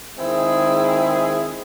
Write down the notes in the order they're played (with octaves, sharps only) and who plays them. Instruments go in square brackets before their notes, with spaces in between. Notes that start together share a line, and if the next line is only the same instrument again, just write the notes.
[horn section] D#3 G#3 C4 E4 G#4